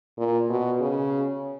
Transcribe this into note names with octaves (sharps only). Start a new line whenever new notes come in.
A#2
B2
C#3